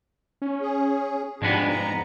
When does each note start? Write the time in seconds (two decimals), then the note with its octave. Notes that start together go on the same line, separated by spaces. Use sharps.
0.42 C#4
0.61 G#4
1.42 F2 G#2 B2 G3 G#3 B3 D4
1.70 A#5